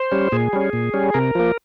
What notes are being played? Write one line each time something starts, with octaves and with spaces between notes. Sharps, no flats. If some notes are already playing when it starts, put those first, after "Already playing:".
Already playing: C5
G3 C#4
A#2 G#4
G3 C#4
A#2
G3 C#4
C3 A#4
F3 A#3